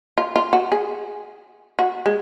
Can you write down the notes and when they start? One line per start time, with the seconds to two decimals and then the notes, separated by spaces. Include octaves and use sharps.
0.18 F4
0.36 F4
0.53 F#4
0.72 G#4
1.79 F#4
2.06 G#3